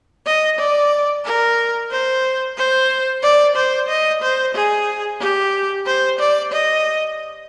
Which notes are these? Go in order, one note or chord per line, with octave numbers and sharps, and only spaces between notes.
D#5
D5
A#4
C5
C5
D5
C5
D#5
C5
G#4
G4
C5
D5
D#5